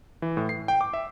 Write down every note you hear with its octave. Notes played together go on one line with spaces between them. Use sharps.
E3
A2
C7
G5
D6
E5